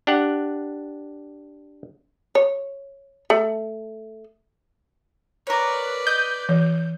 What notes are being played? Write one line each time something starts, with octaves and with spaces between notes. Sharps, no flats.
D4 G4 F#5
C#5
A3
A#4 B4 C#5 D5
D#5 G6
E3